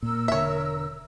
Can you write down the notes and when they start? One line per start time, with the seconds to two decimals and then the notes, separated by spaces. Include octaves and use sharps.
0.03 A#2 A#4 E6
0.28 E1 D3 C#5 E5